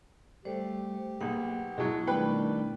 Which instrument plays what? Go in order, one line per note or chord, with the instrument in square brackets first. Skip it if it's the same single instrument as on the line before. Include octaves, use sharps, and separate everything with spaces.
[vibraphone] G3 C5 [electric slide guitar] A3 A4 D5 [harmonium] G4
[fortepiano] B1 [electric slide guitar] A#3 G#4 [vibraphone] F#5
[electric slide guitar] B2 E4 A5 [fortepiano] F#3 G#3
[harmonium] D#3 G3 [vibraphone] A3 D4 [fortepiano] B4 G5 B5